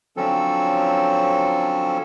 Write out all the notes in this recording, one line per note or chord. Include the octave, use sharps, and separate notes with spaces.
D3 F3 F#3 C4 C#4 A4